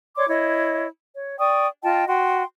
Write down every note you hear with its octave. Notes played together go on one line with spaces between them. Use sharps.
C#5 D5 C6 D6
E4 C#5 D#5
C#5
D5 G5 C#6 D#6
F4 D#5 G5 A5
F#4 G5 C6